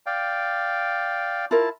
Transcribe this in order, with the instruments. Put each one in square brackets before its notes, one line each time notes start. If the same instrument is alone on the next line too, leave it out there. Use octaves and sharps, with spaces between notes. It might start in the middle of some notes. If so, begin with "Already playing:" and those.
[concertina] D5 F5 G5
[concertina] E4 A5 [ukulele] F4 A#4